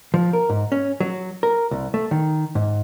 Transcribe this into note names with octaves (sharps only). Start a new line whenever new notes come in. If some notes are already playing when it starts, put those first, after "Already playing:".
F3
A#4
G#2
C#4
F#3
A#4
C2
A3
D#3
G#2